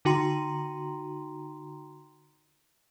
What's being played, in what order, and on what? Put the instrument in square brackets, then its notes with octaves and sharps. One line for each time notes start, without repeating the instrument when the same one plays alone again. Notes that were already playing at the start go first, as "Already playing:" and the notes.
[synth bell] D3 D#4 F#4 G5 A#5 C6